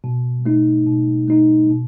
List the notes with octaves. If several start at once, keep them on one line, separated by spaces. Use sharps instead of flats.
B2
A3 D#4
B2
A3 D#4
B2